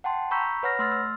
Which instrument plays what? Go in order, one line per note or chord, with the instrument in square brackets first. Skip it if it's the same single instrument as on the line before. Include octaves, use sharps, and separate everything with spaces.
[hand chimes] F#5 G5 A5 C6
A#5 B5 C#6 E6 G6 B6
B4 C#5 F#5 B5 F6 A#6
A3 C6 E6 F6 A6
E6